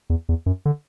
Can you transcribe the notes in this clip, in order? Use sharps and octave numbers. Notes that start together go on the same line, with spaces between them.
E2
E2
F#2
D3